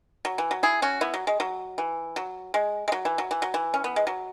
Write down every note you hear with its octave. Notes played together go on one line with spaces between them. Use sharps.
F#3
E3
F#3
E4 G#4
C#4 F#4
B3 E4
F#3
G#3
F#3
E3
F#3
G#3
G#3
F#3
E3
F#3
E3
F#3
E3
C#4
B3
G#3
F#3